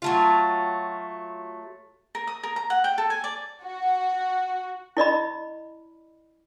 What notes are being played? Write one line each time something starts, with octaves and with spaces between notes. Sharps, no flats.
F#3 A3 F4
A#4
D#6
A#4
A#5
F#5
G5
A4
G#5
D5
F#4
E4 D5 D#5 B5